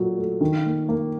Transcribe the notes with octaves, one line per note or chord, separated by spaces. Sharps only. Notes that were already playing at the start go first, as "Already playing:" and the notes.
Already playing: A#2 F#3 A3
A3
D#3
A#3
A#3